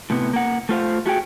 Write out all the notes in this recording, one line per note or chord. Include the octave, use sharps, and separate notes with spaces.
A2 C3 B3
A#3 F#5
A3 F4 C5 F5
A3 F#4 G#4 G5